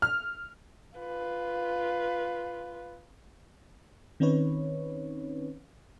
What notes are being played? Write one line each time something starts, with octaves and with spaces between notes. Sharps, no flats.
F6
F4 B4
D#3 C4 C#4 D#4 B4 C#5